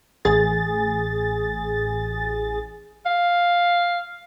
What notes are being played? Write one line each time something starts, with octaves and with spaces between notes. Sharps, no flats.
A1 G#4 A6
F5